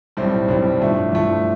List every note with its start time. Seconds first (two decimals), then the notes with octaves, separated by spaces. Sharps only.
0.17 B1 A2 G3 C4 E4
0.48 B1 A2 G3 C4 E4
0.80 G2 F3 A3 E4
1.12 G2 F3 A3 E4